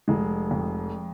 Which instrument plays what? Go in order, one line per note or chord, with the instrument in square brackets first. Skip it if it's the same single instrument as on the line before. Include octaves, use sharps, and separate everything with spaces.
[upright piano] F1 [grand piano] G#3
[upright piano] F2